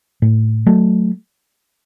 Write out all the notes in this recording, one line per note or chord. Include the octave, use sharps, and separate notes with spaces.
A2
F#3 A3